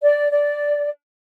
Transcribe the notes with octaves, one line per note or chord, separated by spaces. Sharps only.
D5
D5